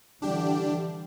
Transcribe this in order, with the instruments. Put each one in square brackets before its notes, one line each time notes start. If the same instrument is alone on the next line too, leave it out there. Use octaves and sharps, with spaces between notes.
[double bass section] D3 E3 G3 [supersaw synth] D4 G4